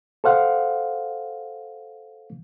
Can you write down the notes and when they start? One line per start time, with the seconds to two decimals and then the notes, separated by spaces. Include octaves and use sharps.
0.24 A4 C5 F5 F#5